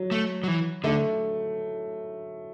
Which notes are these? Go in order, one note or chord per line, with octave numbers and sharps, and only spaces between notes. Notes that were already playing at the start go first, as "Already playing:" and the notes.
Already playing: F#3
A3
F#3
E3
D3 A3